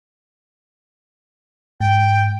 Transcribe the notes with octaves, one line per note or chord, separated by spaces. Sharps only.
G#2 G5